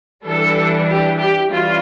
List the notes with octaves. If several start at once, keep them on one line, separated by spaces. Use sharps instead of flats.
E3 G3 D4 A4
G4
G4
E3 G3 C#4 F4